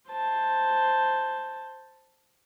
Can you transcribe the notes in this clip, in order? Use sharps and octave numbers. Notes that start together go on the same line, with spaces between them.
C5 A5